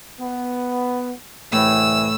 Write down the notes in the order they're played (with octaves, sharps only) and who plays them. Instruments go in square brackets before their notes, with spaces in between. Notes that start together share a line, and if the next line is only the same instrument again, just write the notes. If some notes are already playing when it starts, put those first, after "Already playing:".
[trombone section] B3
[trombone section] C2 E3 [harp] A2 [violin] E6